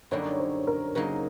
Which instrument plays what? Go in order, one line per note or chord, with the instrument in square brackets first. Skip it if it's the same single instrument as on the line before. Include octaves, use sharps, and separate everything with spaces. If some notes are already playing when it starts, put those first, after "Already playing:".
[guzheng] F#2 D3 G3 A#3 D#4 [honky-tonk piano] C#5
[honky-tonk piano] C5
A#4
[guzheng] C#3 F#3 A#3 D#4 G#4 [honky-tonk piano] A#4